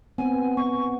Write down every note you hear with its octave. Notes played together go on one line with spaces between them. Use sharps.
B3 C4 G#5
B3 C#6